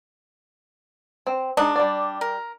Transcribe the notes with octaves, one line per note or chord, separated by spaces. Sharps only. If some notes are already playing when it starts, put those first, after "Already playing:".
C4
G#3 D4 D#4 D#5
G3 D5
A#4